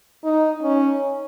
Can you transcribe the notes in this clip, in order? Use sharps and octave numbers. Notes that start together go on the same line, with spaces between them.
D#4
C#4